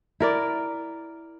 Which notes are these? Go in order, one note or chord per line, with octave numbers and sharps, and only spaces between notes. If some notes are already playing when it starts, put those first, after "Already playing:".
E4 A#4 D5